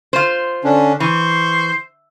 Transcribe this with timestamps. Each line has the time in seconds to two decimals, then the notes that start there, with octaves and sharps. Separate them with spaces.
0.13 F4 C5
0.64 D3 C#4 D4
1.00 E3 C5 C#6